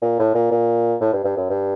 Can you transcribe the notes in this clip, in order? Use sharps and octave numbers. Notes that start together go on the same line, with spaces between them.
A#2
A2
A#2
A#2
A2
G2
G2
F#2
G2